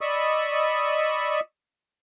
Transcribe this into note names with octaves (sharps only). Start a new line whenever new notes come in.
D5 D#5 B5 C#6 D#6 E6